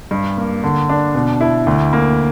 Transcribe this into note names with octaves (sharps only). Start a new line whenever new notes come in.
G2
A#3
D3
D4
B2
E4
D2
A#3